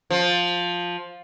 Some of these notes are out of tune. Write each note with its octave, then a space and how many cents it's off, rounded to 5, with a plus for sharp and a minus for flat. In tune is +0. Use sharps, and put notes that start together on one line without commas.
F3 +10